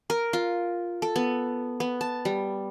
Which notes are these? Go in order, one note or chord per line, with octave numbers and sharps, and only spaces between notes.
A#4
F4
A4
B3
B3
A5
G3